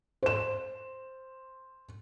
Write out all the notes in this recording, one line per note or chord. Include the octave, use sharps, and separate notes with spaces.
C5 E7